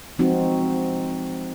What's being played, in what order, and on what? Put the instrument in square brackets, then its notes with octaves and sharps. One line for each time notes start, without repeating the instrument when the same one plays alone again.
[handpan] F3 G#3 C4 D#4 F#4